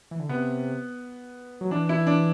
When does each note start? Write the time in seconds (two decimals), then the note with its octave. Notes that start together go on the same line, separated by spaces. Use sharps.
0.11 E3
0.20 D3
0.29 C3 B3
1.61 F#3
1.71 E3 D4
1.89 E4
2.07 D4